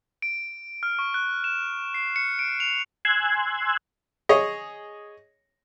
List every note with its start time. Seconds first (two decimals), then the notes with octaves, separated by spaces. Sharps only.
0.22 D7
0.83 F6
0.99 C#6
1.14 F#6
1.44 E7
1.94 C7
2.16 C#7
2.39 D7
2.60 F7
3.05 G#5 C6 E6 F#6 G#6
4.29 G#4 C#5 D#5